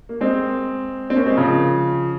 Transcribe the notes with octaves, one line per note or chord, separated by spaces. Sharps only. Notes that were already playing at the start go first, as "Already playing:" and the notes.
A#3
G#3 C4
C4
A#3 C#4
G#3 C4
C#3 F3